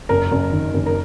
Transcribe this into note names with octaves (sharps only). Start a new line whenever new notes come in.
F#1 A#4
F#1
D#3
F#1
A#4